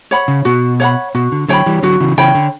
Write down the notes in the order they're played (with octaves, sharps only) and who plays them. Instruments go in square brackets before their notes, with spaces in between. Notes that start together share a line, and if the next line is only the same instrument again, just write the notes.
[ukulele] C#5 F#5 B5
[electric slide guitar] C#3
[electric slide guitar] B2 [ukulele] F#4
[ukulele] C#5 F#5 B5
[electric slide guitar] B2 [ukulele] F#4
[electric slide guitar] D3
[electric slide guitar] D3 F#3 [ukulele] C#5 G5 B5
[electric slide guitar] E3 G3
[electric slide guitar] D3 F#3 [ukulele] F#4
[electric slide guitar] C#3 E3
[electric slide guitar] C#3 E3 [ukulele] C#5 G5 B5
[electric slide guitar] D3